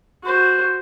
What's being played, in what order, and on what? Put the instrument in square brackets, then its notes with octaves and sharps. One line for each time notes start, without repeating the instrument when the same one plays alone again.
[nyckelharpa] F#4 C5